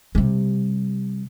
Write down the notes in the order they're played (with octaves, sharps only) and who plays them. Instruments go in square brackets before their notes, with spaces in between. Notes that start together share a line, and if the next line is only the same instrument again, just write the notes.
[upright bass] C3 G3